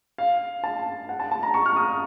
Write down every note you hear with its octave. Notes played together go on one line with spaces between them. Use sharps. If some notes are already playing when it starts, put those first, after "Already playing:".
F5
A5
F#5
A5
A5
A#5
C#6
F6
D#6